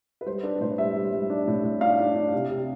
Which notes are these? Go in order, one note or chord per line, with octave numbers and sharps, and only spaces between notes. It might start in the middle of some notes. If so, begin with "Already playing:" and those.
B4
G3 C5
D4 B4
A2 C5
G3 E5
G3
G3
D4
A2
A2
D4 F5
D4
D4
C3
C3